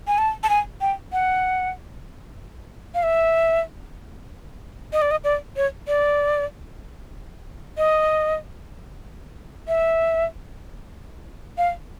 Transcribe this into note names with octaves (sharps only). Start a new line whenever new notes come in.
G#5
A5
A5
G#5
G5
F#5
F5
E5
D#5
D5
D#5
D5
C#5
D5
D#5
E5
F5